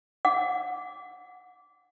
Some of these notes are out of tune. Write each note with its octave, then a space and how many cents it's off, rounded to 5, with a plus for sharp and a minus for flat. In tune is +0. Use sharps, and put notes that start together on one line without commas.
F#5 -25 D6 -15